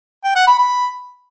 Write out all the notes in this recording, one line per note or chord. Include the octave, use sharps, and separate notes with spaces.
G5
F#5
B5
B5